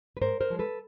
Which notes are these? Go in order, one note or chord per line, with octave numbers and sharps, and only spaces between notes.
B4
G#2 A#4 C5
A#4 C5
F3 G#3
A4 B4